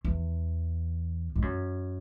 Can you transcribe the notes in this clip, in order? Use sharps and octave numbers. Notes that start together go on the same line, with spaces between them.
E2
G#2
F#2